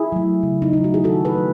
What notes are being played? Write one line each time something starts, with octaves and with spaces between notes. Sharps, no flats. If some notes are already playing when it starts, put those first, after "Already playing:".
Already playing: E4 G#4
F#3 A3
C#3
D#4
F#3 A3 E4
F#4
G#4
D#3 F#4 A4
G#4 B4
F#3 A3